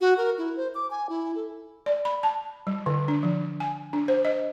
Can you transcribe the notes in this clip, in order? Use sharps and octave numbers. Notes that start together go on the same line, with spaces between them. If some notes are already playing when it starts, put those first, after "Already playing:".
F#4
A#4
E4
C5
D6
G#5
E4
A4
D5
B5
A5
G3
D3
D4
F3
G#5
D4
C5
D#5